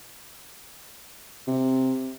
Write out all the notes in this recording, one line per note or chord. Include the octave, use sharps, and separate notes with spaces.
C3